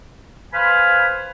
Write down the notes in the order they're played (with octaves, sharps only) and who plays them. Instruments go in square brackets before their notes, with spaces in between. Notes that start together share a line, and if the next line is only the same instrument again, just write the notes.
[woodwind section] B4 C5 F5 G#5 B5